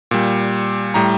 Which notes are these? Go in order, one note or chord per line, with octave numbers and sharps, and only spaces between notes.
A#2 G3
A2 G3 A#5